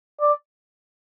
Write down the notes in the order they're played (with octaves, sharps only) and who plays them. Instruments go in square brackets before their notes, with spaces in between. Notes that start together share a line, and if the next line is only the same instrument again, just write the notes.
[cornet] D5